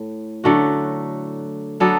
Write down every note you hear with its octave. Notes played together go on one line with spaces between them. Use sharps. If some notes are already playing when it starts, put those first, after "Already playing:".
Already playing: A2
D3 F#3 A3 F#4
F#3 B3 D4 A4